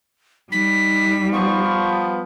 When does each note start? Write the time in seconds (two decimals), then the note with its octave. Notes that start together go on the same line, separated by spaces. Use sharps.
0.52 G3 D#4 B6
1.33 F3 B3 C#6